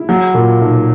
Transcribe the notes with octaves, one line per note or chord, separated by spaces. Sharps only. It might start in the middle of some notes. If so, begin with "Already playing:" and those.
Already playing: E4
F#3
A#2
B1